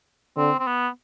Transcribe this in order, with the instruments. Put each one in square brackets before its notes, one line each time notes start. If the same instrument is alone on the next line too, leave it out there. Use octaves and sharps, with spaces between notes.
[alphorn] D3 [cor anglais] C4
[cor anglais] C4
B3